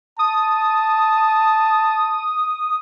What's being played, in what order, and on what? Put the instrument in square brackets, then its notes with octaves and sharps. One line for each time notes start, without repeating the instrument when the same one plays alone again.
[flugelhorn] A5 [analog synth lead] D#6